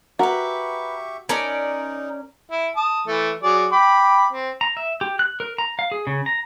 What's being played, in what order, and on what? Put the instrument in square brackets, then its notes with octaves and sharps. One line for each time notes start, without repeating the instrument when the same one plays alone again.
[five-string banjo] F#4 [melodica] G4 E5 C#6 [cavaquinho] A#4 B4
[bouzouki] C#4 A#4 D5 [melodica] D#4 [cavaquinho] A5
[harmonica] E4
A5 D#6
E3 A3
F#3 G#4 D5
G5 B5 D6
C4
[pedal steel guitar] A#5
E5
G4
F#6
A#4
A#5
F5
G#4
C#3
A#5